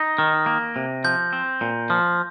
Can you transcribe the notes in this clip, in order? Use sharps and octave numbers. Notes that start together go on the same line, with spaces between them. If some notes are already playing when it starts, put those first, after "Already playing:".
Already playing: D#4 A#6
D#3
A#3
C3
F3 G6
C4
A#2
F3